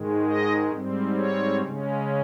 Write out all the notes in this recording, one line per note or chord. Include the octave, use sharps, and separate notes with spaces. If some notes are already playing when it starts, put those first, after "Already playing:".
Already playing: G#2 D#3 G#3
D#5
G#2 G3 C4
C#5
C#3 G#3 C#4